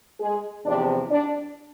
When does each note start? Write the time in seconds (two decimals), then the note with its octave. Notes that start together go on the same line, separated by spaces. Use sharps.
0.21 G#3 G#4
0.65 E2 C3 F3 D4 D5
1.10 D4 D5